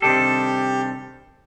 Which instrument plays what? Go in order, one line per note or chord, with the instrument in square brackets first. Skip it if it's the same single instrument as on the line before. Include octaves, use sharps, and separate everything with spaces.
[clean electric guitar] C3 D#3 G3 D4 A4 [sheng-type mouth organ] G4